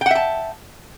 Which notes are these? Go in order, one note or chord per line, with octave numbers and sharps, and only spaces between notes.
E5 F#5 G5 A5